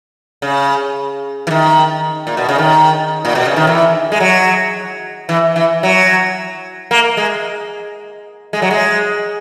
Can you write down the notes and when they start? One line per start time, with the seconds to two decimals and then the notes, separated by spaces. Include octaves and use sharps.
0.42 C#3
1.47 E3
1.51 D#3
2.27 A#2
2.37 B2
2.49 C#3
2.58 D#3
3.25 A#2
3.35 B2
3.46 C#3
3.56 D#3
3.67 E3
4.12 G#3
4.20 F#3
5.29 E3
5.56 E3
5.83 F#3
6.91 A#3
7.17 G#3
8.53 G#3
8.62 F#3
8.71 G#3